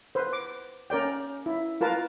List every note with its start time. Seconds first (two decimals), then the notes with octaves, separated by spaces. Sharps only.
0.15 B4 C5
0.33 D6
0.90 C#4 A#4 D5 G5
1.46 E4
1.81 F4 A#4 B4 A5